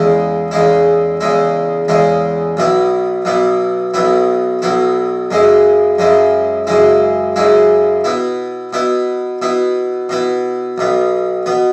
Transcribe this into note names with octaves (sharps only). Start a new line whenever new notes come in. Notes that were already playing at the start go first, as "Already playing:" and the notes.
Already playing: E2 C#3 G#3 E4
E2 C#3 G#3 E4
E2 C#3 G#3 E4
E2 C#3 G#3 E4
B1 B2 B3 E4
B1 B2 B3 E4
B1 B2 B3 E4
B1 B2 B3 E4
F#2 C#3 G#3 E4
F#2 C#3 G#3 E4
F#2 C#3 G#3 E4
F#2 C#3 G#3 E4
B2 B3 E4
B2 B3 E4
B2 B3 E4
B2 B3 E4
B1 B2 B3
B2 B3